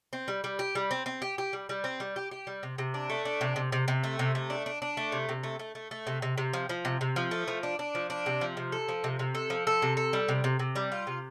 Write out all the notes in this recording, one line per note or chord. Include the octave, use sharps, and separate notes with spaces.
C4
G3
G3
G4
G3
C4
C4
G4
G4
G3
G3
C4
G3
G4
G4
G3
C3
C3
D4
A3
D4
C3
C3
C3
C3
A3
C3
A3
D4
D4
D4
A3
C3
C3
A3
A3
A3
A3
C3
C3
C3
F3
F3
C3
C3
F3
A3
F3
D4
D4
F3
D4
C3
F3
C3
A4
F3
C3
C3
A4
F3
A4
C3
A4
G3
C3
C3
C3
G3
F4
C3